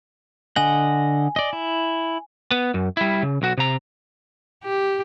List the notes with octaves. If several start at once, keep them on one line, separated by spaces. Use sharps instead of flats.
D3 D#5 F#5 G#5
D5 D#5
E4
B3
F#2
G3 E4
C#3
B1 F#4
C3 A#5
G4